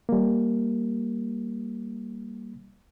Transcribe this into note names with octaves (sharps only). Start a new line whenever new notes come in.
G3 A#3